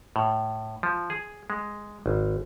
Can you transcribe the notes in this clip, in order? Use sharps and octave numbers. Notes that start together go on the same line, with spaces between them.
A2
F3
G#4
G#3
G#1